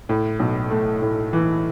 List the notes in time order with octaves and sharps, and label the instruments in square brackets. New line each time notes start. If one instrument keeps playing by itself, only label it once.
[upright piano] A2
B1
A3
A2
E3